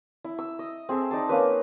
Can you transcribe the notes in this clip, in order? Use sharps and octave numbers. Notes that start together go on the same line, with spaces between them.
E4
E6
D#5
C4 G#4 A4 E5
D#4 D5 A5
A#3 C#4 B4